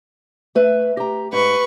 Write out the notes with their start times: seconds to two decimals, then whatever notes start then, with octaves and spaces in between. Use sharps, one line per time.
0.55 A3 B4 E5
0.97 G4 A#5
1.33 G#2 B4 C#6